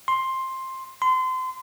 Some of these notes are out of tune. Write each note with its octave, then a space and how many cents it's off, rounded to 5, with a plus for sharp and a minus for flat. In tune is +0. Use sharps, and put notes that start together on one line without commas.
C6 +10
C6 -30